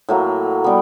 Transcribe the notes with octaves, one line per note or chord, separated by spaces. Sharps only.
A2 F#3 A#3
G3 B3